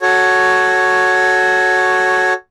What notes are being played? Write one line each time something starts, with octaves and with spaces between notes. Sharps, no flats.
F#4 A4 C#5